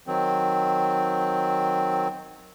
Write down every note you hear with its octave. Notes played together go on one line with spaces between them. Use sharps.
D#3 F#3 C4